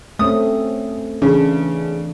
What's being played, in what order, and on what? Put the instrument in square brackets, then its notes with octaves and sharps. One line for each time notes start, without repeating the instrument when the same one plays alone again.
[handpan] A3 C4 C#4 [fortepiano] D#6
[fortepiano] C#3 [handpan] E3 D4